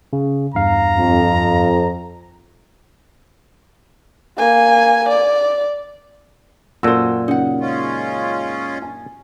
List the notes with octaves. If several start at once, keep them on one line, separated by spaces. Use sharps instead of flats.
C#3
E2 G2 F5 A#5
F2
A#3 G#5
D5
F#2 A#2 F#4 A4 C5 E6
C#3 D#4 F#5
G#3 C#4 F4
G#5